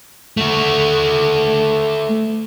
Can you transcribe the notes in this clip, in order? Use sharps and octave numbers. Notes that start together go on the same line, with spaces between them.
A3 F#4